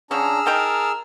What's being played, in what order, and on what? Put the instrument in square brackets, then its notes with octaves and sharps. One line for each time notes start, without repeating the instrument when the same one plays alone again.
[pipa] D3 F3 C#4 [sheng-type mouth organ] D4 A#5 [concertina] G#4 E6 F6
[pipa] D#4 G5 A#5 [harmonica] A#4 [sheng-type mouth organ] A5